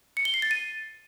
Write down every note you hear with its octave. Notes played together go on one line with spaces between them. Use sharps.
C#7
G7
C7
A6
D#7